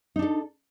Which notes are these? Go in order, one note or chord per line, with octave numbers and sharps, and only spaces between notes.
D4 D#4 A4